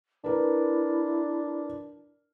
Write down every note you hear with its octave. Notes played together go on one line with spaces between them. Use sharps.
D4 E4 A#4 B4